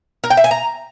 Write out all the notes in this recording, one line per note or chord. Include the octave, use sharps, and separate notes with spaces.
A#4
G5
E5
G#5
A#5